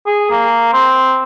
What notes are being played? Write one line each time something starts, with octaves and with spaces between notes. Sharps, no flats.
G#4
A#3
C4